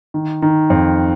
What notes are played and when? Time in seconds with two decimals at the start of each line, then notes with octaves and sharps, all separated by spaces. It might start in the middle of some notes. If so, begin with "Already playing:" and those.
0.14 D#3
0.42 D#3
0.70 F2